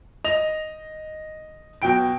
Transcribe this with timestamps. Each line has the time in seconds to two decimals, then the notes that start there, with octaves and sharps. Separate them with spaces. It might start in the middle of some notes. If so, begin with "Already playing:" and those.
0.24 D#5 F7
1.82 B2 F#3 G5 D7